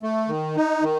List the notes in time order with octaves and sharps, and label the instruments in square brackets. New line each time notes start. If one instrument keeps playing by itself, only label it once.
[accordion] A3
D#3
D#4
D#3